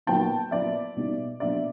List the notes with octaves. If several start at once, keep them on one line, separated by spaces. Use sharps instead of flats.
A#2 F#3 B3 D#4 G5 A5
A#2 F#3 B3 E4 D5 E5
B2 G3 B3 D#4
B2 F#3 A#3 D4 D5 E5